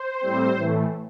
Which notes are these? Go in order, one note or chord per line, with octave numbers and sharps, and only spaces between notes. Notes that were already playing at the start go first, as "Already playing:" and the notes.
Already playing: C5
A2 G3 C4
A2 E3 A3